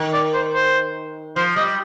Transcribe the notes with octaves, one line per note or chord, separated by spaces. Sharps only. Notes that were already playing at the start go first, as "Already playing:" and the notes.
Already playing: D#3
D5
C5
C5
F3 C5
G3 D#5